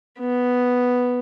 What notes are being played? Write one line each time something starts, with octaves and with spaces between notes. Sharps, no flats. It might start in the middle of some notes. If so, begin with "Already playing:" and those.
B3